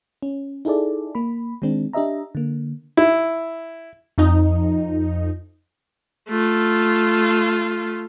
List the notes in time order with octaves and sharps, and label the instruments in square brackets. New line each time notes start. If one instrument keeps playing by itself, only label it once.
[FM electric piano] C#4
D#4 E4 G#4 A4 D5
A#3 B5
D#3 G#3 C4 D4
D4 G4 D#5 E5 A#5
D3 A#3
[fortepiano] E4
[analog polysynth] F2 D#4
[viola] A3 F4